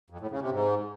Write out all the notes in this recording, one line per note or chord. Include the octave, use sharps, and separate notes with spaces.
F2
A2
C#3
C3
G#2